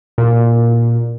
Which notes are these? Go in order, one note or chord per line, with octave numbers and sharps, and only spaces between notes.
A#2